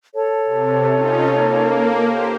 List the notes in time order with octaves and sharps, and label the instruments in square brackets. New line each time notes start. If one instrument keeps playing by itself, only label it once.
[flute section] A4 C#5 A5
[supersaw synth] C3
C#4 D#4 F4
A#3
G4 C5